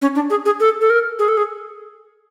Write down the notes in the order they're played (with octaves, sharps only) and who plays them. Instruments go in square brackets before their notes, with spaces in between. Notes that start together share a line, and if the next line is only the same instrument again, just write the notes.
[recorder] C#4
D4
G#4
G#4
A4
A4
A#4
G#4
A4
G#4